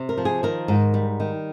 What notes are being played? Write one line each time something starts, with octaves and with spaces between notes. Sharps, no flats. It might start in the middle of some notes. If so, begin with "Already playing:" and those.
Already playing: C3
A#4
F3
G#4
D#3 A#4
G#2
G3
D#3